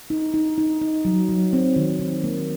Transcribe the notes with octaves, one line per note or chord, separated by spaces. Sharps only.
D#4
D#4
D#4
D#4
F#3
F#3
C4
D#3
D#3
A#3